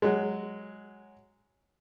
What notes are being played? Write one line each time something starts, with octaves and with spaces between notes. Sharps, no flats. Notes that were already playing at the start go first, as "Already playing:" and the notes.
F#3 G#3